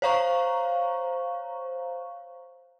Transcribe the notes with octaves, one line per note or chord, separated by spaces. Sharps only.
C5 C#5 F5 A#5 C#6